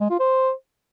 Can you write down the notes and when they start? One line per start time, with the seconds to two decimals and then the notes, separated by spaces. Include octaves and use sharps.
0.01 G#3
0.10 F4
0.20 C5